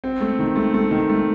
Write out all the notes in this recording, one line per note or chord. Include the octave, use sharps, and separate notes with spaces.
C4
A3
D#3
A3
A3
D#3
A3